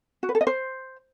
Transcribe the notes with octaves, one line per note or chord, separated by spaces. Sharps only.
F#4
B4
A4
D#5
C5